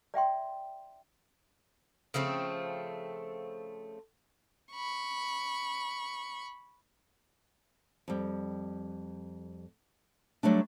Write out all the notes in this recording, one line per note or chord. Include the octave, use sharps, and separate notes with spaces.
D5 E5 G5 C6
C#3 F3 A3 C4
B5 C#6
F2 G3
F#3 G3 A3 D4